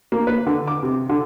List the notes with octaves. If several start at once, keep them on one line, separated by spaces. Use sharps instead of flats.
A#3
B4
D3
D6
C3
D3